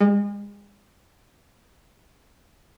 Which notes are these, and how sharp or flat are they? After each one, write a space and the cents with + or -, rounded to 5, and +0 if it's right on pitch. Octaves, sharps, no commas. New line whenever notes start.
G#3 -35